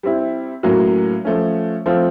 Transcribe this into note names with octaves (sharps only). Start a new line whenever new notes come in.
G3 C4 E4
A2 F#3 A#3 C#4 F#4
F3 A3 C#4
F3 A3 C4 F4